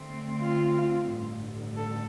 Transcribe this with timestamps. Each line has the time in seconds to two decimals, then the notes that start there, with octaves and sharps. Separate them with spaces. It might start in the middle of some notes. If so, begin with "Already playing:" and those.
Already playing: D3 A3 C4
0.42 F4
1.09 A1 G2 D3
1.77 A4